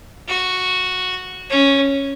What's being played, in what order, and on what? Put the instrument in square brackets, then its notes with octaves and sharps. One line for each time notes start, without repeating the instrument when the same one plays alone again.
[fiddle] F#4
C#4